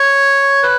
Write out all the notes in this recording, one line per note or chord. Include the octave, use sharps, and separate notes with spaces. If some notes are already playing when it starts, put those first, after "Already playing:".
Already playing: C#5
B4